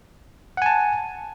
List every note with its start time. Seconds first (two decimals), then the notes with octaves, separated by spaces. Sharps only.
0.57 F#5
0.62 G#5
0.66 A5